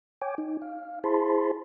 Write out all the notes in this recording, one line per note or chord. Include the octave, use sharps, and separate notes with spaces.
C#5 G5 G#5 D6
D#4
F5
E4 G#4 C5 A5 B5 C6